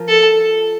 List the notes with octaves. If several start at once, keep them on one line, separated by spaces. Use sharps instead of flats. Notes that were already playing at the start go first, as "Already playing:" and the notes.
Already playing: F3 F4 A#4
A4